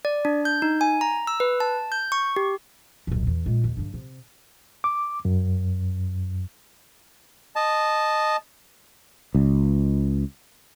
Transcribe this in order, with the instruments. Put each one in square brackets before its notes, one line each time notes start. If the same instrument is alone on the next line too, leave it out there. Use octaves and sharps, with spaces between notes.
[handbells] D5
D4
G6
D#4
G#5
A#5
E6
B4
A5
G6
C#6
G4
[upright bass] D#1 B1
E2
A#2 G#3
D#2
G2 D3
C3
[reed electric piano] D6
F#2
[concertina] D#5 A5
[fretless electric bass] C#2